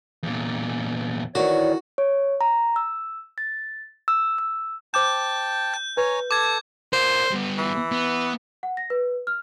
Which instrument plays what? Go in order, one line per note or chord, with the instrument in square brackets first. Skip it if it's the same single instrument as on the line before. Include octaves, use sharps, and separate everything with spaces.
[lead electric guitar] E2 A#2
[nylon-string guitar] D#3 E3 B3 [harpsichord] F#4 [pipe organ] C#5 D5
[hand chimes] C#5
A#5
E6
A6
E6
E6
[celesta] C5 D6 E7 [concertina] G5 A5 [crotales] G6
[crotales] G6
[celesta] B4 [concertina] C#5 G#5 A#5
[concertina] A4 A5 [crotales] D6 G#6
[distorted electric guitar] A#4 D5 [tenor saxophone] C5
[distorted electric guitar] G2 B3
[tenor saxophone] E3
[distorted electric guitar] B3
[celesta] F#5
A#6
B4
F6